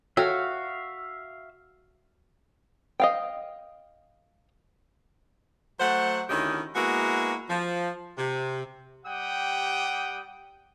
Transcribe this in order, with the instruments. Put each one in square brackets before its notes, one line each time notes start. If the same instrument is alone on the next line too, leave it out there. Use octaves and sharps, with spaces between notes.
[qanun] F#4 [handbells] A4 C#5 G5 [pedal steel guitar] E5 F5
[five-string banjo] D#5 F5 G5
[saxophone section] F#3 A3 C5 F#5
D2 D#3 C#4 E4 G4 D#5
G#3 A#3 B3 E4 F#4
F3
C3
[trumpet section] G3 G4 F#5 G5 D#6